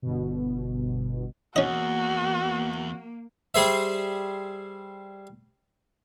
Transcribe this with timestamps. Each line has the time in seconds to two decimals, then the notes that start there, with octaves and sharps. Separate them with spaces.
0.02 G1 B2
1.56 E2 A#3 C#4 F#4 D#5
3.54 G3 G#4 C5 E5